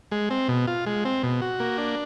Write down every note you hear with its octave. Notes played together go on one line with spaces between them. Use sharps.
G#3
C4
B2
F4
G#3
C4
B2
F#4
A#3
D4